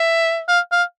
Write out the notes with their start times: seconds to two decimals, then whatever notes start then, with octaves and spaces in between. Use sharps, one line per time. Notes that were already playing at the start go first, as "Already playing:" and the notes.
Already playing: E5
0.48 F5
0.72 F5